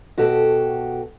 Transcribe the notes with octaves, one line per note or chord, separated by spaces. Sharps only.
B2 F#4 G4 A4